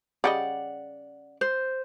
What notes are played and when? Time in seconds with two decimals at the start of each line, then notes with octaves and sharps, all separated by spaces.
0.24 C#3 G3 D5 D#5 F#5
1.41 C5